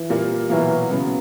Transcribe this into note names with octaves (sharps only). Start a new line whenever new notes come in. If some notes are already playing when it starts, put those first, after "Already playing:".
Already playing: E3
A#2 G3 A#3
B2 E3 F#3 A#3
C#3 F#3 B3